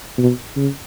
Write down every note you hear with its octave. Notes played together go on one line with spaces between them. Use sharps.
B2
C#3